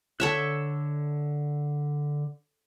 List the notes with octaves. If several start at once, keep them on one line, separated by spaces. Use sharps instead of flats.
D3 A4 C#5 E5 A5 F#6